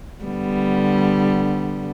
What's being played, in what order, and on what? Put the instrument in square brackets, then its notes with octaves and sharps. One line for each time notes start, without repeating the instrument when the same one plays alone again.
[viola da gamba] D3 G3 B3